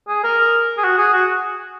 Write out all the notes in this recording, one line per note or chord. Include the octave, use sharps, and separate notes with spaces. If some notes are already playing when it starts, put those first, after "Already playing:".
G#4
A#4
G#4
F#4
G#4
F#4